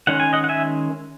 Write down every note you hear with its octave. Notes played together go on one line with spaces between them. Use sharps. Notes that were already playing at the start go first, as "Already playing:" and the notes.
D#3 G#3 C#4 F#5
G#5
D#5 F#5
F#5
E5 G#5